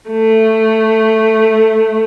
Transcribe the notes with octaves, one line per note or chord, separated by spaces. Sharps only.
A3